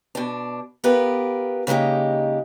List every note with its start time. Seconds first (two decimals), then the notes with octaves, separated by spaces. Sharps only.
0.15 B2 D4
0.84 B3 F4 G4 A#4 B4
1.67 C#3 G#3 A#3 D#4 G4